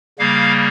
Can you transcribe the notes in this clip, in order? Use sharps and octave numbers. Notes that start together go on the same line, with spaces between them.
C#3 G3 A#3 F5